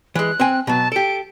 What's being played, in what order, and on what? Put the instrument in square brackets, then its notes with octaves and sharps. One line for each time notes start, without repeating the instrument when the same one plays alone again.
[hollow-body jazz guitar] E3 G#3 [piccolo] F#6
[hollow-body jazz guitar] C4 G5 G#5
[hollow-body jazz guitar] B2 F#3 [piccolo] A5
[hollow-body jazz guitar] G4 A4 [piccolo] D7